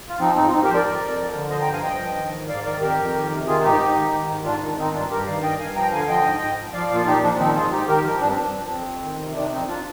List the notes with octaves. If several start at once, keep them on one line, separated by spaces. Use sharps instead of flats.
F4
F3 C4 D#4
G#2 C4 D#4
F4
G#2 C4 D#4
G4 A#4
F3 C5
A#4 D5
F2
F2
F3
D3
F3 C5 D#5
G5 A#5
G2
F5 G#5
G2 D#5 G5
F3
D#3
G#2
G#2 D5 F5
D#3 A#4 D5
F2 G4 A#4
F2
D#3
C3
D#3 F4 G#4
G#2 D#4 G4
G#2
D#3
D#3
G#2
G#2 D4 F4
D#3
D#3 C4 D#4
G2 D4 F4
G2 G4 A#4
D#3 D5 F5
G2 D#5 G5
G2 F5 G#5
F3 G5 A#5
D3 F5 G#5
F3 D#5 G5
G#2
G#2
F3
F3 D5 F5
A#2
F4
A#2 D#4 G4
F3 D4
D#3 C4 D#4
G#2 F4 G#4
G#2 D#4 G4
D#3 G4 A#4
F3 G4 A#4
G2 D4
C4
G2 D4
F3
F2 C4
F2
D#3
C3
D#3 D4
F2 C4 D#4
D4 F4